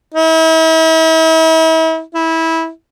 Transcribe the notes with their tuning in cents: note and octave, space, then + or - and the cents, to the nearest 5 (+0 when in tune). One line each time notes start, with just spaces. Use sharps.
E4 -40
E4 -20